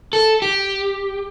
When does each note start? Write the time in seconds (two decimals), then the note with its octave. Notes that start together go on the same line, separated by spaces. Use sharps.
0.13 A4
0.42 G4